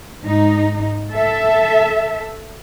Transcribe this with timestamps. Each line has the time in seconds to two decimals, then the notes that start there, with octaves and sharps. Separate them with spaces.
0.23 G#2 D#4
1.13 A4 E5